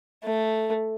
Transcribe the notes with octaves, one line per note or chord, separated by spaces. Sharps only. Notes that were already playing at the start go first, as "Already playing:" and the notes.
A3